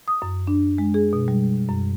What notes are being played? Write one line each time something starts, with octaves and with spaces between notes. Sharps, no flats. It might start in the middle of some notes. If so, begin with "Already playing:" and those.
D#6
F#2
D4
G#3
G#4
B2
G3
F#2